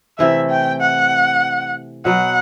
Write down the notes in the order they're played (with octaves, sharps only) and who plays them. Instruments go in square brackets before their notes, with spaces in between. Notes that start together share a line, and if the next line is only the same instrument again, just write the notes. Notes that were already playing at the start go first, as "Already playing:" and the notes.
[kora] C3 E3 A3 [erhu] E5
[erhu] G5
F#5
[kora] B2 F#3 B3 F#4 [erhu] F#5